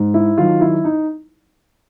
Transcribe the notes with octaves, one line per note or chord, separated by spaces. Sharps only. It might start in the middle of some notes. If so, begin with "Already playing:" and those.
Already playing: G#2
E4
D#3 F#3 F4
E4
D#4